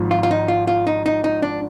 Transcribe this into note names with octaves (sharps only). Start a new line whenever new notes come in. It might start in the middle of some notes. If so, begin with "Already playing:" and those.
Already playing: G#1 G#2 F3
F4
F4
D#4
F4
F4
D#4
D#4
D#4
D4